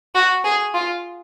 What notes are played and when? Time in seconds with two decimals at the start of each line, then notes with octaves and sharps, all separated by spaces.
0.15 F#4
0.44 G#4
0.74 F4